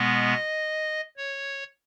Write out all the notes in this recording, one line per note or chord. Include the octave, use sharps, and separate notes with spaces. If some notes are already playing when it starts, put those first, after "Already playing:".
Already playing: B2 G#3 B3 D#5
C#5